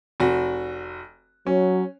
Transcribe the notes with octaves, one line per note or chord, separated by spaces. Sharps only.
F1 F#4
F#3 C#4